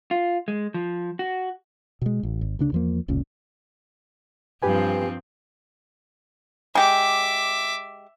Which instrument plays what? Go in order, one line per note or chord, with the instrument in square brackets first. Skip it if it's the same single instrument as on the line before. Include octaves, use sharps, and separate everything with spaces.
[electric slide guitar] F4
G#3
F3
F#4
[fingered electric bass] B2 G#3
A1
G#1
D2 C#3 D4
E2 F3 A#3
F1 C#2 A#2 C#4
[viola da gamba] G2 F3 C4 [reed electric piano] G4 B4 G#5
[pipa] G#3 G4 [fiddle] E5 D6